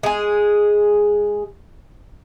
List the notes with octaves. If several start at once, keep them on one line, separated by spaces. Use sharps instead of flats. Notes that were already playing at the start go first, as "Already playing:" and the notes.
G#3 G#4